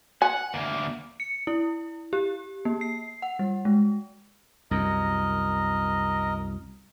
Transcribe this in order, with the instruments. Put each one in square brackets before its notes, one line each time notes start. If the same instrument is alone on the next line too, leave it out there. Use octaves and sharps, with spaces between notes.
[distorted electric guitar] F#5 [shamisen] G#5
[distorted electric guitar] D2 A#3
[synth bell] C#7
E4
G4
A#3
C7
F#5
G3
G#3
[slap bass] C2 F#2 [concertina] A#4 D#5